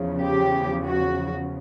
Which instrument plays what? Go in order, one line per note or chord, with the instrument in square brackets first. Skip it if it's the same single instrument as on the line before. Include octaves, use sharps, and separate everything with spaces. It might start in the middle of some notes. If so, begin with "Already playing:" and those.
Already playing: [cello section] E2 C#3 F3
G4
F#4